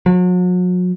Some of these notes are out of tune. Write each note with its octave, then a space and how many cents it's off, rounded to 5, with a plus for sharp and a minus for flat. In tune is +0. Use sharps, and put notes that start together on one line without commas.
F#3 -40